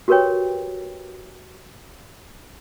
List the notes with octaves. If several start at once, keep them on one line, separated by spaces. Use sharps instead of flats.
F#4 G4 A#4 B4 C#5 G5